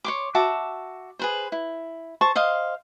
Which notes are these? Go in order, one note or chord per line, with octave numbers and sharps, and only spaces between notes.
C#5 C6 D6
F#4 E5 A5 D6
G#4 B4 C5
E4
C5 A5 C#6
C5 D#5 F5 C6